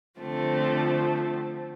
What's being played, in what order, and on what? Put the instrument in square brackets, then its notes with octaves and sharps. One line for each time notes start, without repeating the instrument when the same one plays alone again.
[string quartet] D3 F3 A3 C4